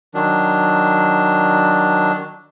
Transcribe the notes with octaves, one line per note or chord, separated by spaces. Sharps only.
D#3 F#3 D4